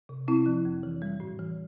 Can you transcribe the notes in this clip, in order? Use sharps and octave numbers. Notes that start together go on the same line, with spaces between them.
C3
C3 C4 E4
F3
F2
E3
G3
A2
E3